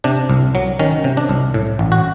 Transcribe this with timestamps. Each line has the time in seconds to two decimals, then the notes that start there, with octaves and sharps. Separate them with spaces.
0.04 C3 D4
0.30 C2
0.55 F#3
0.79 D#3 C#4
1.04 C3
1.17 D4
1.29 C2
1.54 A2
1.79 A1
1.92 F#4